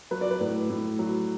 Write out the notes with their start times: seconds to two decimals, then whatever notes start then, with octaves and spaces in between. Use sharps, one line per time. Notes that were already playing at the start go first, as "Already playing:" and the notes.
0.11 F#3 B4
0.21 D5
0.31 B4
0.40 A2
0.70 A2
0.99 F#3